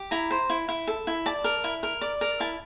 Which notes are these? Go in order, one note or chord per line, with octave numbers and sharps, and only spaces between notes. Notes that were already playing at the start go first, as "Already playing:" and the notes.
Already playing: G4
E4 A#5
C5
E4
E4
A4
E4
D5 A5
A#4
E4
A#4
D5
A#4
E4 A5